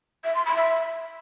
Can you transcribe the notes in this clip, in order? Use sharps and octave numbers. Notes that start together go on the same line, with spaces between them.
E5
C6
B5
E5